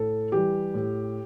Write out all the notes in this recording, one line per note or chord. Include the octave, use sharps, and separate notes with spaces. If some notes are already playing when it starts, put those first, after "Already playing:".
Already playing: A2 A4
E3 G3 G4
A2